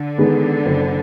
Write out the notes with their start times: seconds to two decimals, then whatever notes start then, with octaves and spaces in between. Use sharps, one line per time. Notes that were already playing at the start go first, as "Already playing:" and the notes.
Already playing: D3
0.18 D#3 G#3 B3
0.66 F#1